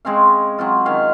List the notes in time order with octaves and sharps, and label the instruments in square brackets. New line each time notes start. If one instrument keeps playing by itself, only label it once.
[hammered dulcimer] G#3 C4 C#4 F5
F#3 C4 F4
D#3 C#4 F5